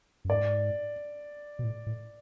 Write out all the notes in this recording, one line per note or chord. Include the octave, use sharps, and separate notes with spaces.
F#2
G#2 D5
B2
A2
A2